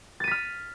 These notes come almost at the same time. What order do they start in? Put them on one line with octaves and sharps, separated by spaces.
A6 D#7 B6 F6